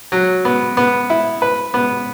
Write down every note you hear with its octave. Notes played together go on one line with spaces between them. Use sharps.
F#3
B3
B3
E4
B4
B3